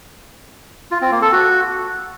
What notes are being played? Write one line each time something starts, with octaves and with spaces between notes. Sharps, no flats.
F4
C4
A#3
A4
F#4